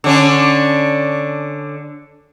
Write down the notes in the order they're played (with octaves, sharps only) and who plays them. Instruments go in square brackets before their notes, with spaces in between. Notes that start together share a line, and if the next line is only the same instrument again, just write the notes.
[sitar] D3 C#4 D4